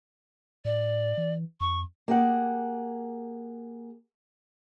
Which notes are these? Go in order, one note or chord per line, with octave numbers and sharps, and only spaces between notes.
A2 D5
E3
F2 C#6
A#3 G4 G#4 F#5